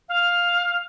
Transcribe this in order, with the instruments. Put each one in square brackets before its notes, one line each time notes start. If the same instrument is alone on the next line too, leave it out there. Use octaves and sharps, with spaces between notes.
[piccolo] F5